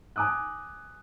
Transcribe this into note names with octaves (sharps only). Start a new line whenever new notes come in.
G#5 A#5 D6 D#6 F#6